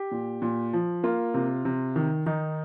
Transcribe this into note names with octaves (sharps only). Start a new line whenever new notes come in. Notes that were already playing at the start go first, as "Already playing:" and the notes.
Already playing: G4
A#2
A#2
F3
A#3 F4
C3
C3
D#3
D#3 D#4